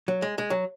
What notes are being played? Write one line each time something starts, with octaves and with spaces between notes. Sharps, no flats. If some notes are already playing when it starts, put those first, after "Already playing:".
F#3
G#3
G#3
F#3